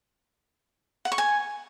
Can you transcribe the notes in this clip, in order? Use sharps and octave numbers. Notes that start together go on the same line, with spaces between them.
F#5
C#6
G#5